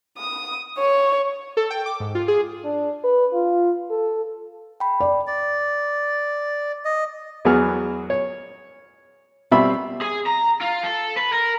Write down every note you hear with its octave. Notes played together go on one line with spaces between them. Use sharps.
D#6
C#5
A4
G5
D6
G#2
F4
G#4
D4
B4
F4
A4
G5 B5
D5
D5
D#5
E2 F#3 B3 G#4 F6
C#5
B2 G3 C4 E5 B5
G#4
A#5
F4
A4
B4
A#4